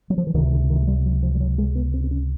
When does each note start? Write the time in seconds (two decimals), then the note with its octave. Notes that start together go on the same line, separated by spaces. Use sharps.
0.10 F#3
0.18 F3
0.27 E3
0.34 C#2 C3 D#3
0.52 D3
0.70 D#3
0.82 G#3
0.87 G3
1.06 F#3
1.23 F3
1.35 G3
1.40 F#3
1.58 G#3
1.75 B3
1.94 C4
2.04 C4
2.11 C#4